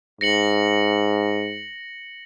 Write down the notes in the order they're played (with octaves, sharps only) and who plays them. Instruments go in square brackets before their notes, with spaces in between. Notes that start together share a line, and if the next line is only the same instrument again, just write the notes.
[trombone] G#2 [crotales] A#6 C#7 F#7